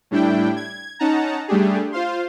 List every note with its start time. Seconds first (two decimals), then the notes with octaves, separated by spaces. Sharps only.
0.11 A2 G3 D4 E4 G5
0.56 G#6
0.99 C#4 D#4 F#5 A5 A#5
1.48 G3 A3 D4 G4 G#4
1.92 F4 C5 F5 C6